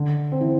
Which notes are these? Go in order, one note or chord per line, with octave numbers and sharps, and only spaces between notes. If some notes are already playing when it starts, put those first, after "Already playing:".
Already playing: D3
C4
E3